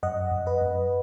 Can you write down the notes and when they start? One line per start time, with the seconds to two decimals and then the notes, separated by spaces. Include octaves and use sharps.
0.03 F#2 D#5 F#5
0.31 F#2
0.46 B4 D#5
0.61 F#2